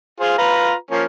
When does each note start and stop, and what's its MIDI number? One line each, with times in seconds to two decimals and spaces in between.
0.20 0.35 65
0.20 0.35 68
0.20 0.35 72
0.38 0.74 65
0.38 0.74 71
0.38 0.74 82
0.91 1.04 53
0.91 1.04 58
0.91 1.04 61